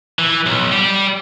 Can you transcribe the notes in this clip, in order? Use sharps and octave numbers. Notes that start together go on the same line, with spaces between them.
E3
B1
G3